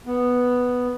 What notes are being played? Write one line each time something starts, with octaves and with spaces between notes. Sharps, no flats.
B3